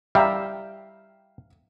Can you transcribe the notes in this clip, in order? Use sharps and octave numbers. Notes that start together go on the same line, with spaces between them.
G3 E5 F5 G5 A#5